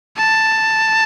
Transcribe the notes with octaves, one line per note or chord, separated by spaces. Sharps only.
A5